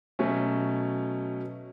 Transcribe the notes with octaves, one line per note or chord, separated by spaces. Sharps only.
B2 F#3 A3 C#4